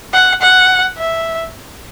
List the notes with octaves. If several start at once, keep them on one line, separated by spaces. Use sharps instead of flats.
F#5
F#5
E5